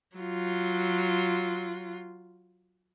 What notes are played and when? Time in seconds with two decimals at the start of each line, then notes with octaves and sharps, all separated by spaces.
0.17 F#3 F4